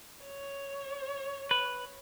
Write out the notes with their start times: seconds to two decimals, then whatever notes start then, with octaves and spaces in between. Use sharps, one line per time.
0.24 C#5
1.51 B4